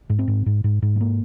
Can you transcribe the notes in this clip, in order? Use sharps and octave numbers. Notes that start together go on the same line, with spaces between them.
G#2
C4
G#2
G#2
G#2
G#2
G#3
A#3